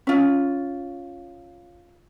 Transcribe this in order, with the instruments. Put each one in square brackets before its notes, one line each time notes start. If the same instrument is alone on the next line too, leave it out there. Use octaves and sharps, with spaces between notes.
[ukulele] C#4 F4